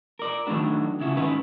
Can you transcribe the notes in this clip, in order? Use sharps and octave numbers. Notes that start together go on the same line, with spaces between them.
A#4 D5
D#3 F#3 A3 D4 F#4 B4
C#3 E4 F#4
G#2 D#3 C#4 B4